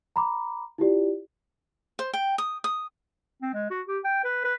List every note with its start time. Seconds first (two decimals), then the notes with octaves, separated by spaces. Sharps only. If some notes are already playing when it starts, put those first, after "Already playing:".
0.16 A#5 B5 D6
0.78 E4 F4 G4 D5
1.99 C5
2.13 G5
2.38 D#6
2.64 D#6
3.42 C4
3.54 G#3
3.70 F#4
3.87 G4
4.04 G5
4.24 B4
4.44 B4